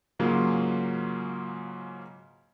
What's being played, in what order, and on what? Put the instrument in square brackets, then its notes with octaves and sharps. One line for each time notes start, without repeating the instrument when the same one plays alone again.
[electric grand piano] G#2 C#3 F#3 A#3 C#4 F4